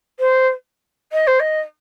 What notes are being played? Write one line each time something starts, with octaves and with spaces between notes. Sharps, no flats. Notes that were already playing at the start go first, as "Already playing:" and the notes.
C5
D#5
C5
D#5